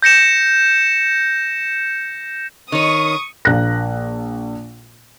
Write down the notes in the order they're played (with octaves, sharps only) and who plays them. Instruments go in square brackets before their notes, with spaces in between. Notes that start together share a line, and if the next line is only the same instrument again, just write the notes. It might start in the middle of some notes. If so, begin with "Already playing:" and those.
[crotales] G6 A#6 C#7 E7
[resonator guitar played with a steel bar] D#3 C#5 [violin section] C#6 D#6
[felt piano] A#1 A#3 F#6 A#6